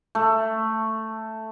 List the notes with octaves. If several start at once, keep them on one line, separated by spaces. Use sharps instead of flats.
A3